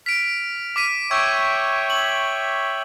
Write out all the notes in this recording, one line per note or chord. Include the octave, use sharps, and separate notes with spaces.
F6 B6 D7
D6 B6 D#7
C#5 E5 G5 C#6 E6 G#6
F#7